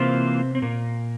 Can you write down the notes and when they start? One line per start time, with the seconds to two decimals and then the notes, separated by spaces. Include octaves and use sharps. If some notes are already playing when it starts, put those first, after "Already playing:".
Already playing: C3 E3 A#3 C4 F4 C5
0.55 C4
0.62 A#2 A#3